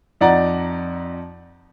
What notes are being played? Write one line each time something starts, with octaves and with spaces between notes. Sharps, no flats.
F2 D#4 D5 F#5 A#5 A6